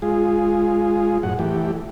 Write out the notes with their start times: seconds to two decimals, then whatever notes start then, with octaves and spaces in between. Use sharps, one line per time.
0.02 G#3 F4 G#4
1.23 F#2 A2 F#5
1.39 E3 A3 G4